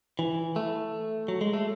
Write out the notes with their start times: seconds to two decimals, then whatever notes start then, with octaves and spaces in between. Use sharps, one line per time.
0.19 E3
0.56 A3
1.28 F#3
1.41 G#3
1.53 A3